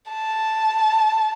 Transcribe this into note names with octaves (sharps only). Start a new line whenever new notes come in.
A5